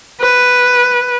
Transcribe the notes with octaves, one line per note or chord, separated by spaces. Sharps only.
B4